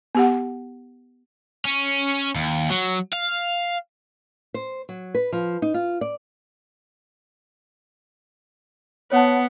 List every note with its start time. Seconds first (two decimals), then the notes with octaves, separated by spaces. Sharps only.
0.15 B3 G4 F#5
1.65 C#4
2.36 D#2
2.70 F#3
3.13 F5
4.54 C5
4.89 F#3
5.15 B4
5.33 F3
5.62 D#4
5.74 F4
6.01 D5
9.12 B3 C#5 F#5 A5